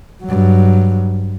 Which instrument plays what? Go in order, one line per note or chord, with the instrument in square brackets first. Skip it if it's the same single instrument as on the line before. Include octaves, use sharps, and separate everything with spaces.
[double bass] G2 F#3